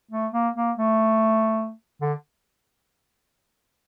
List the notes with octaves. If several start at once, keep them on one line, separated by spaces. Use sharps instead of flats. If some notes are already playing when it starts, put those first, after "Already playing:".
A3
A#3
A#3
A3
D3